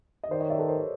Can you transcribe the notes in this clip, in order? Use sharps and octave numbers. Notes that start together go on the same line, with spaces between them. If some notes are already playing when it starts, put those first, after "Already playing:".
D#5
D#3 C5 D5
C#5 D#5
D5 E5
A4 B4
A#4 C5
C#5